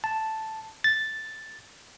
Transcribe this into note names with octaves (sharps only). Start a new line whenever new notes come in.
A5
A6